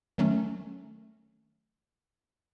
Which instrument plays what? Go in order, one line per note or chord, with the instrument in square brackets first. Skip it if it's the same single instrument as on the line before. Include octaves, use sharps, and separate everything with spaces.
[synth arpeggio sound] D#3 F#3 A3 C#4